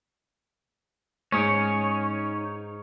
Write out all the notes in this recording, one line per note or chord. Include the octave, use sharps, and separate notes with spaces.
G#2 C#4 D#4 C#5 D#6 D7